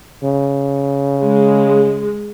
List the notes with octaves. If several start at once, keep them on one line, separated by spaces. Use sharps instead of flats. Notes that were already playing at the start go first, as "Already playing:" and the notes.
C#3
G#3